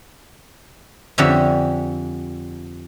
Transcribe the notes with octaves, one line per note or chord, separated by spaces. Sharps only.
F2 D3 G4 G#4 C#5 E5